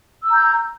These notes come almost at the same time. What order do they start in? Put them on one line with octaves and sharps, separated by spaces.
E6 A#5 G6